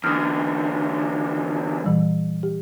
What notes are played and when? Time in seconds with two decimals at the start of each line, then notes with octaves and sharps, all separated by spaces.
0.04 E2 D3 D#6 F6
1.84 A#2 E3 G3
2.43 G4